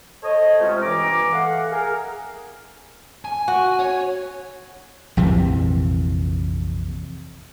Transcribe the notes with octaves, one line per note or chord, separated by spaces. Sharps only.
A4 C5 C#5 D#5
C3 G#3 A3 C#4 F4
G2 E3 A#5 D6
A3 F5 F#5
G#4 A#4
G#5
F#4
C#5
A#1 F2 C3 E3